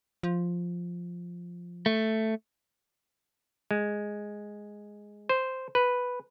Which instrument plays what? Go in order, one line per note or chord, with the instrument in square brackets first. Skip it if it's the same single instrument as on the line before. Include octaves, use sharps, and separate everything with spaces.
[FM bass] F3
[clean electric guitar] A3
[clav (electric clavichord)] G#3
C5
B4